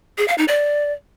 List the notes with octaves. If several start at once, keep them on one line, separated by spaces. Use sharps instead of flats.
G#4
F5
D#4
D5